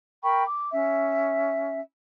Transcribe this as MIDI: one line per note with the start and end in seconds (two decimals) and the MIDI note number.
0.23 0.42 70
0.23 0.42 79
0.23 0.42 83
0.23 0.42 85
0.47 0.70 86
0.71 1.80 61
0.71 1.80 76